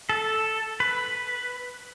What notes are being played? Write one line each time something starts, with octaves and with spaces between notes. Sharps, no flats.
A4
B4